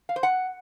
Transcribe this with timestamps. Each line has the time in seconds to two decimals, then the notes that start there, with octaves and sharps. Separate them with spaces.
0.09 F5
0.16 C5
0.23 F#5